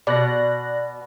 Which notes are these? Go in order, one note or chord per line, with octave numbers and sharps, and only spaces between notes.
B2 D5 F#6 A#6